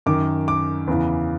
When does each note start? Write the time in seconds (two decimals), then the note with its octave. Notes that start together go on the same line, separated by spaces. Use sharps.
0.06 F#2 D#3 D6
0.48 D6
0.87 E2 C#3 E3